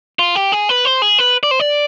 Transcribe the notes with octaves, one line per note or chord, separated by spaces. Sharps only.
F4
G4
G#4
B4
C5
G#4
B4
D5
C5
D5